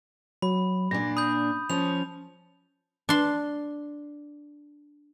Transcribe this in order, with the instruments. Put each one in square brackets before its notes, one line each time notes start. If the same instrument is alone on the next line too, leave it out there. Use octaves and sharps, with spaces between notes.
[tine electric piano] F#3 [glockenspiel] B5
[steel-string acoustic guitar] A#2 D4 [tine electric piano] A#6
[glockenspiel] B5 G6 [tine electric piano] D#6
[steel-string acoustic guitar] F3 C#4 [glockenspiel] F7
[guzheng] D4 C6